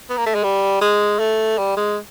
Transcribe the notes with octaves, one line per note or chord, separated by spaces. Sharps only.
B3
A#3
A3
G#3
G3
G#3
A3
G3
G#3